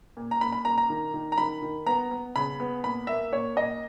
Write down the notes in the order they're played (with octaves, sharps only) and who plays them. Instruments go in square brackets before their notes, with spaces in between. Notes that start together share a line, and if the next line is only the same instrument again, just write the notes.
[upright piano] A#2
A#5
A#2 B5
B5
A#2 A#5
A#5
D#3
D#3
A#5
D#3 B5
D#3
B3 A#5
B3
C#3 B5
B3
A#2 B5
A#3 E5
A#2 C#5
A#2 D#5